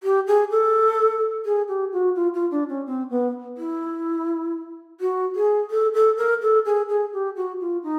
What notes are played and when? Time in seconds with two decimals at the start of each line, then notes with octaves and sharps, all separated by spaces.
0.03 G4
0.27 G#4
0.51 A4
1.45 G#4
1.68 G4
1.93 F#4
2.15 F4
2.34 F4
2.51 D4
2.69 C#4
2.86 C4
3.10 B3
3.57 E4
5.00 F#4
5.35 G#4
5.71 A4
5.94 A4
6.17 A#4
6.42 A4
6.65 G#4
6.89 G#4
7.13 G4
7.36 F#4
7.60 F4
7.83 D#4